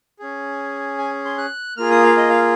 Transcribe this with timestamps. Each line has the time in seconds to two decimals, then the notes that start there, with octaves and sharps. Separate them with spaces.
0.19 C#4 G#4
0.98 G#5
1.25 C6
1.38 F#6
1.77 A#3 F4 G#4 F6
1.91 D#6
2.04 F5
2.17 D#5
2.30 F5